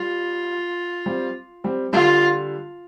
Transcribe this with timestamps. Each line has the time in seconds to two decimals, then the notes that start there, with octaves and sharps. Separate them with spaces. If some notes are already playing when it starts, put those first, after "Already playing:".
Already playing: G3 F4
1.06 G3 C4
1.64 G3 C4
1.93 D3 G3 F4